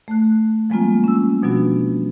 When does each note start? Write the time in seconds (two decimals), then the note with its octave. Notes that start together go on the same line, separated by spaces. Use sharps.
0.08 A3 F#6
0.70 F3 G3 G#3 A#3 C4 F4
1.04 C#4 E6
1.43 B2 F3 F#3 B3 D4 F#4